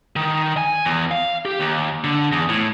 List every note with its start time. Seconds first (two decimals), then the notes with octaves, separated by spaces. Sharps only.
0.16 D#3
0.57 G#5
0.85 E2
1.11 F5
1.45 G4
1.59 D#2
2.04 D3
2.32 E2
2.49 A2